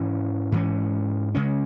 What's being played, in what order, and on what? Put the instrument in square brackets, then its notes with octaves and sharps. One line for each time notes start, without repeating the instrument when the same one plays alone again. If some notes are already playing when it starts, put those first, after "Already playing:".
Already playing: [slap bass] G#2 E3 C#4
G#2 E3 C#4
C#3 G#3 C#4